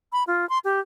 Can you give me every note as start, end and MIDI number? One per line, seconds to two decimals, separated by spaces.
0.12 0.23 83
0.27 0.48 65
0.49 0.58 84
0.64 0.80 67